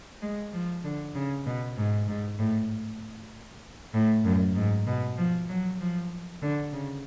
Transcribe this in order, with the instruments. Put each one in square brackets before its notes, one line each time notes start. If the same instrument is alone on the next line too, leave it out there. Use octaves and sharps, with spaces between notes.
[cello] G#3
F3
D3
C#3
B2
G#2
G#2
A2
A2
F#2
G#2
B2
F3
F#3
F3
D3
C#3